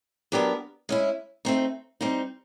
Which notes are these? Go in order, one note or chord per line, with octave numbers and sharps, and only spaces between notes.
F#3 B3 D4 G4 A#4
G#3 C#4 E4
A3 C4 D#4
G3 C4 D#4